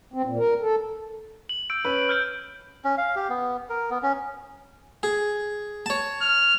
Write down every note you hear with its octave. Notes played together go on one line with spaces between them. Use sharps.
C4
A#2
A#4
A4
F#7
E6 G6 D7
C#4 B4
F6 G6 D7
C#4
F5
G4
B3
A#4
B3
C#4
G#4
C#5 A5
F6